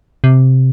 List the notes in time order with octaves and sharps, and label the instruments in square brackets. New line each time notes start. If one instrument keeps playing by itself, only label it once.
[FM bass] C3